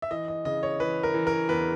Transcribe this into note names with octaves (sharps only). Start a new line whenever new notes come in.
E5
E3 D#5
D#5
C#3 D#5
C#5
E3 B4
A#4
E3
A#4
E2 B4